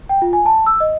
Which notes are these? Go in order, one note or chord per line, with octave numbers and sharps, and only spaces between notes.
G5
F4
G#5
A5
E6
D#5